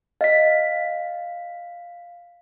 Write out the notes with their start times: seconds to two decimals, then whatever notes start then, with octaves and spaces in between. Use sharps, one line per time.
0.21 D#5 F5 B6